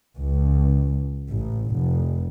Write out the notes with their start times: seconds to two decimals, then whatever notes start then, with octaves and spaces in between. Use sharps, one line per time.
0.18 C#2
1.30 A1
1.74 F1